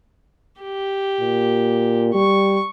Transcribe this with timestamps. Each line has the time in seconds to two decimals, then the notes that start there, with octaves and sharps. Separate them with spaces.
0.62 G4
1.21 A#2
2.15 G3 C#6